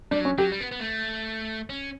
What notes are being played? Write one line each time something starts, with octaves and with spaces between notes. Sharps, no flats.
G3 D4
F#3
C#4
F#3 G4
G3
B3
B3
A3
C#4